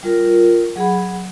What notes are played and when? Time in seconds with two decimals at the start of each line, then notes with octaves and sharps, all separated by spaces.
0.03 G3 F4 A#4
0.76 F#3 G#4 F#5 B5